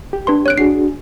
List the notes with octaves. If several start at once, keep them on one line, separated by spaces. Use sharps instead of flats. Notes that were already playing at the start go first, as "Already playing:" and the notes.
G4
D4 B4 C6
C#5 F#6 D7
D4 F#4 G#4 C7